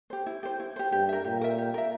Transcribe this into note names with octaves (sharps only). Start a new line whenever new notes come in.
G4 C5
E4
G4 C5
E4
G4 C5
G2 G4
A#4 E5
A#2 G4
A#4 E5
G4
A#4 E5